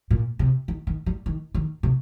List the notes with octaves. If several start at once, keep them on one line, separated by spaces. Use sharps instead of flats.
A#2
C3
D#3
D#3
G3
D#3
D#3
C3